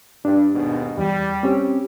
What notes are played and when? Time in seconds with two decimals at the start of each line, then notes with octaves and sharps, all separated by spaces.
0.25 G2 D4
0.53 D#2 G#2 B2
0.98 E2 G3
1.43 C4 C#4 G4